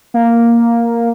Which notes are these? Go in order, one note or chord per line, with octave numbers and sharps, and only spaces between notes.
A#3